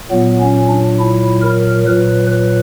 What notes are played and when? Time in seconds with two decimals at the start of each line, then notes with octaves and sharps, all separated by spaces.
0.11 A#2 F#3 B3
0.40 C#4
0.69 D4
0.99 E4
1.42 A#4
1.86 A#2 F#3 B4
2.30 B4